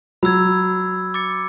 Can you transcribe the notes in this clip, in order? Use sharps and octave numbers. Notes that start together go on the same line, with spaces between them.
F#3 B5 E6 G#6
D6 A6 C#7